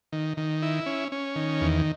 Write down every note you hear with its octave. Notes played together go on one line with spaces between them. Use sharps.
D#3
D#3
E4
C#4
C#4
D#3
E2